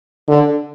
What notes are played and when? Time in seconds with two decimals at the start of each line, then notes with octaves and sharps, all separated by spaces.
0.28 D3